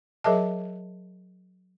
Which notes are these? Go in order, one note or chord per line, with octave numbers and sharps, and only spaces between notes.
F#3 G#4 A#4 D#5 E5 A5